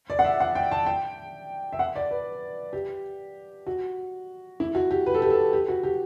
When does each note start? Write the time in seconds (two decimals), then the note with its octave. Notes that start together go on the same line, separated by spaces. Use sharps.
0.10 D5
0.19 F#5
0.24 E5
0.40 F#5
0.55 G5
0.71 A5
0.86 G5
1.73 E5
1.79 F#5
1.96 D5
2.11 B4
2.73 G4
3.67 F#4
4.60 E4
4.75 F#4
4.91 G4
5.06 B4
5.14 A4
5.22 G4
5.30 A4
5.53 G4
5.68 F#4
5.83 G4